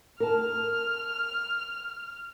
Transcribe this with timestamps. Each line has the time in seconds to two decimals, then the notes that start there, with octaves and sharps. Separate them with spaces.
0.20 A#4 A5 F6